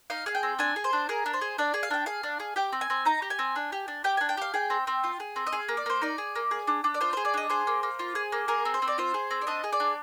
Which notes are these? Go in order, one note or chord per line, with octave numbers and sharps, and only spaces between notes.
D#4 F5
G#4 F5
G5
C4
D4 G#5
G#4
C5
D4
G#4 A#4
D4
C5
G#4
D4 D5
G#4
F5
D4 G5
G#4 F5
D4
G#4
G4 G5
C4
G#5
C4
D#4 A#5
G4
G#5
C4
D4
G4
D4
G4 G5
D4 G#5
G5
G4 F5
G#4 G5
C4
C4
F4
G#4
C4
D#5
G#4 F5
A#3
D5
A#3 C5
D#4 D5
G#4
A#3
G#4
D4
D4
D5
F4 C5
G#4 C5
D5
D4 D#5
G#4 C5
A#3
A#3
F4
G#4
A#3
G#4 A#4
C4
C5
C4
D5
F4 C5
G#4
C4
D5
D4 D#5
G#4
D5
D4